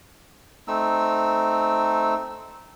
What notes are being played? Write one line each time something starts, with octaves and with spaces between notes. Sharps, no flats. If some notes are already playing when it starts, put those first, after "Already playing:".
A3 C4 D#4 E6